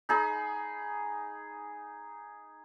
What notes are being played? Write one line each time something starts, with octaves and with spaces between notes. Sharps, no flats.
D#4 G#4 B5